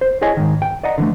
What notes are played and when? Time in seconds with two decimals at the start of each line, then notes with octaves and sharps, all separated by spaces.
0.01 C5
0.21 E4 G#4 C#5 D#5 G#5
0.37 G#2 D#3
0.62 G5
0.83 D5 D#5 F#5 A#5
0.98 D3 E3 A3